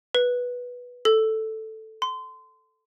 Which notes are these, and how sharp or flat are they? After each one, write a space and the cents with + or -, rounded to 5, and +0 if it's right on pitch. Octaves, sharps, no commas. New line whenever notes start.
B4 -10
A4 +0
C6 -25